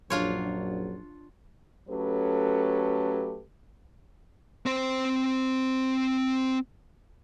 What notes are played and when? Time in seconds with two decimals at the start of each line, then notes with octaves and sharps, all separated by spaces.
0.10 A#1 F#2 F#3 D4 F4 C#5
1.89 F#3 A3 C#4 G4 A4 B4
4.66 C4 C5